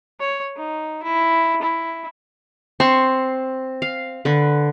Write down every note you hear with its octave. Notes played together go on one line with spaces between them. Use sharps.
C#5
D#4
E4
E4
C4 C6 C#6
F5
D3 B4